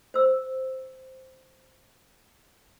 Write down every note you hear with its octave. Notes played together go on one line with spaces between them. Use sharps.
C5 E6